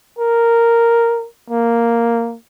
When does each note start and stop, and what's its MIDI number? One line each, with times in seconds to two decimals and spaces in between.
0.19 1.27 70
1.50 2.36 58